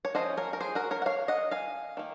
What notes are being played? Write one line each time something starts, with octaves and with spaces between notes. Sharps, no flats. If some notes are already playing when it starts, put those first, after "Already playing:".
C#5
F3 A#3 C#4 C5 D#5
A#4 C#5
A#4
G#4 C5
F#4 A#4
A#4 C#5
F#5
C#5 F5
D#5 F#5
F5 G#5
D#3 A#3